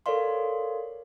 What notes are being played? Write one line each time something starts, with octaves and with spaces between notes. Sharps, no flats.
A4 A#4 C#5 D5 F5 C6